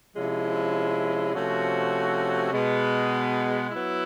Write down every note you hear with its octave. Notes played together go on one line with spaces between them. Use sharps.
C3 F3 G#3 C#4 E4
C3 F3 A3 C#4 F#4
B2 G#3 B3
F#3 B3 E4